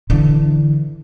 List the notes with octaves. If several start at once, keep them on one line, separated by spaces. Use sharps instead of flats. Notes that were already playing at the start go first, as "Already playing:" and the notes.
D3 E3